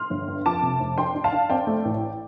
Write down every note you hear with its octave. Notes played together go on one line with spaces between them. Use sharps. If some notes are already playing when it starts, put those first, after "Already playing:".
Already playing: C6 F6
G1
G2
F2 A5 D6
C3
F1
D4 G5 C6
D4
F5 A5
D4
C4 D5 G5
A3
A1